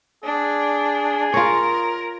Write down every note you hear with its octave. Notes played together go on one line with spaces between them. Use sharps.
D4 G#4
F4 A#4 C#5